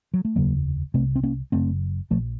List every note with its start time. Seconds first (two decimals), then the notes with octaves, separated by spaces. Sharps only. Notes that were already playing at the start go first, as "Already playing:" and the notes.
0.14 F#3
0.25 A3
0.36 F1 D#2 C#3 F#3 A#3
0.94 C3 A3 C4
0.98 C2
1.16 C4
1.23 A#3 C#4
1.52 F#1 F#2 C#3 A3 C4
2.10 A#1 A#2 F3 A3